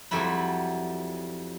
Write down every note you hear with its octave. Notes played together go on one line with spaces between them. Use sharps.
F2 F#3 G3 E4 B5